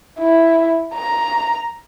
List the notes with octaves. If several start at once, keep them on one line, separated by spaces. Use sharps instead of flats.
E4
A#5